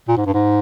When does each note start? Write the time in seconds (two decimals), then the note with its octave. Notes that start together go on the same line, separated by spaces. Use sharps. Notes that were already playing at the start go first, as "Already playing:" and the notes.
0.08 A#2
0.17 G#2
0.26 G2
0.34 G#2